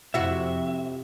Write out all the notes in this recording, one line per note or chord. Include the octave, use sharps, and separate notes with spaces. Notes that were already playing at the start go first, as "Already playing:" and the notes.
F2 C3 E4 F#4 E5